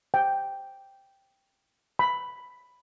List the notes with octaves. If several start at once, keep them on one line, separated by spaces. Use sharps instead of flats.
G5
B5